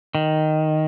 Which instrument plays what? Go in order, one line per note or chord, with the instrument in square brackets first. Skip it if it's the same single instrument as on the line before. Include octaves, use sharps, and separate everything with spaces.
[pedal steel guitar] D#3